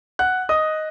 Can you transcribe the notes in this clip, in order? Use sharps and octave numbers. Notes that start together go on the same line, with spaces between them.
F#5 F#6
D#5 D#6